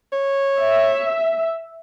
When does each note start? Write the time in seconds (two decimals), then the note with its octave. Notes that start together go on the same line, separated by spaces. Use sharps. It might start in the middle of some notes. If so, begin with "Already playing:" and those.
0.12 C#5
0.61 E5